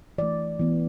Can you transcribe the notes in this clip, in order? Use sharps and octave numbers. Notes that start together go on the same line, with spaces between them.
E3 A3 D5
E3 B3